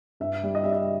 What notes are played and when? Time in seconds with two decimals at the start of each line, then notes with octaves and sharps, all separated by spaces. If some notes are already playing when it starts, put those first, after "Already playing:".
0.20 G2 E5
0.43 G3
0.55 D#5
0.64 G3 E5
0.73 D#5